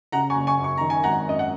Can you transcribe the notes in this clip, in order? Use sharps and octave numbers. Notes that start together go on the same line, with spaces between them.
C#3 F#5 A#5
G#5 C#6
F#1
G#5 C#6
F#2
C#6
D#3 A#5
G#5
G#1 F#5 A#5
F#2 D#5
F#5